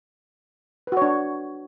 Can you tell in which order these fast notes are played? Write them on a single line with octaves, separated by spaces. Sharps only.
B4 F#4 C#5 D4